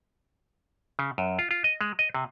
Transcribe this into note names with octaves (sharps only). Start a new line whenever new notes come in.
C#3
F#2
F4
F4
D#5
G#3
D#5
C3